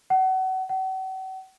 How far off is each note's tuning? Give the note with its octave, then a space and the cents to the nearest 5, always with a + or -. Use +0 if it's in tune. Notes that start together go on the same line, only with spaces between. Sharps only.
F#5 +30
F#5 +40